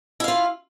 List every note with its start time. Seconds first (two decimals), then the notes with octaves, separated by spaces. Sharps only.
0.20 E4
0.24 F5
0.28 F4